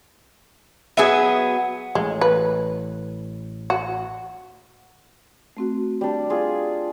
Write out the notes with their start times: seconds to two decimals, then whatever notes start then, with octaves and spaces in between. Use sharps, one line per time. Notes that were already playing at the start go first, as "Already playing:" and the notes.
0.97 F#3 B3 G#4 E5
1.95 A1 G#3
2.21 B4
3.70 F#4
5.57 A3 C4 F#4
6.01 G3 D4
6.30 F4 G#4